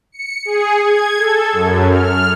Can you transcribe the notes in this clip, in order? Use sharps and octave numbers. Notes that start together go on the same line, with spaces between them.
C#7
G#4
G#6
A4
F#2
F6